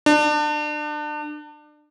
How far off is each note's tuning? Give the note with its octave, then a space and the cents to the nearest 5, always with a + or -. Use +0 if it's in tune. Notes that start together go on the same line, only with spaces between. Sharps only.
D4 +30